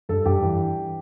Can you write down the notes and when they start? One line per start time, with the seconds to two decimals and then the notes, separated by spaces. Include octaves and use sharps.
0.09 G2 A4
0.26 G2 G4
0.43 E3